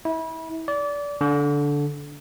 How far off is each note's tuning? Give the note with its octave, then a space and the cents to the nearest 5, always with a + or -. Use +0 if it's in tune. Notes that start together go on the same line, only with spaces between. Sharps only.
E4 -30
D5 -25
D3 -15